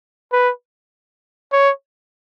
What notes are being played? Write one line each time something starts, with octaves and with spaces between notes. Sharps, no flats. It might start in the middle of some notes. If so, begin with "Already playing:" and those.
B4
C#5